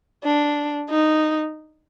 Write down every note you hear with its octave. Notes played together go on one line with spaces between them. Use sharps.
D4
D#4